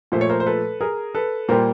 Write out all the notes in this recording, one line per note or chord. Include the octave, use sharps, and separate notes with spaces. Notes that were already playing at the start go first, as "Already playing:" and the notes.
A#2 F3 A3 C5
C#5
A#4 C5
C5
A4 B4
G#4 A#4
A4 B4
A#2 G3 A#3 A#4 C5